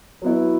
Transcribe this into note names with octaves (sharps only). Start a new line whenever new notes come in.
F#3 B3 E4